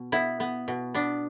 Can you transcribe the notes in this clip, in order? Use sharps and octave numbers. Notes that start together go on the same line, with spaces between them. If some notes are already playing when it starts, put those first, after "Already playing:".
Already playing: B2
B3 E4
B3
B2
B3 D4